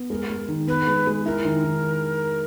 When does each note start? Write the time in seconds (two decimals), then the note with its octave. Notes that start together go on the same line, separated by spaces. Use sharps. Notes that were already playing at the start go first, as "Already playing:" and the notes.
Already playing: B3
0.10 G#3 A#4
0.30 G#3
0.48 D#3
0.67 B3 B4
0.87 G#3
1.07 G#3
1.26 E4 A#4
1.45 D#3
1.64 D#3